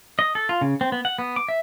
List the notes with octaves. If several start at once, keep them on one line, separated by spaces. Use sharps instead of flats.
D#5
A4
F4
C#3
C4
B3
F#5
B3
D6
E5